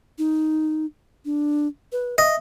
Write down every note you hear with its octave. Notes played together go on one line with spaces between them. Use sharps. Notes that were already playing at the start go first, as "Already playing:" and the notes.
D#4
D4
B4
D#5 E5